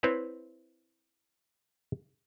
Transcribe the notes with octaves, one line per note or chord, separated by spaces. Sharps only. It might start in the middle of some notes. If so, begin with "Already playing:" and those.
C4 E4 B4 C#5 E5